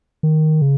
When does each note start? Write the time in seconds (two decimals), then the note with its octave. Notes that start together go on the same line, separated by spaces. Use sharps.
0.23 D#3
0.62 C#3